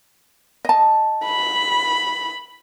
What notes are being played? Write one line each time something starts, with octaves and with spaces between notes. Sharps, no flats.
D#5 A5
B5